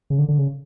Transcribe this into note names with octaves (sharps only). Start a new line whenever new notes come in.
C#3
D3
D3
C#3